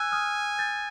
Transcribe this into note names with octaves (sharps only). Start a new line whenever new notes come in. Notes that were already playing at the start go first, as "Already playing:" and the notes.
Already playing: G#5 E6 F#6
D#6 F6
G6 A6